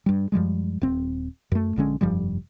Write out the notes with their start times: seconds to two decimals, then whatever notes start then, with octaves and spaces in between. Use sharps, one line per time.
0.06 G2 G3
0.32 F#2 F3 G3 G#3
0.82 D#1 C4
1.52 F#2 A3
1.76 A#1 D3 G#3 C#4
2.01 F1 G2 F3 G3